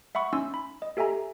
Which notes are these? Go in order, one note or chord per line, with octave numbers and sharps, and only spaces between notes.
E5 F#5 B5 C#6
C#4 D#4 G#5 C6 E6
B5
D#5
G4 A4 E5 G#5 A#5